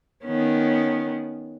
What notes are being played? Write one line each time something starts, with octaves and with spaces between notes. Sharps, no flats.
D#3 B3 C#4